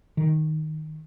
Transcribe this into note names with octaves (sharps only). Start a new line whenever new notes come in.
D#3